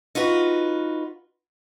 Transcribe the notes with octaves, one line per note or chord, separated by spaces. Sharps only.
D#4 F4 F#4 B4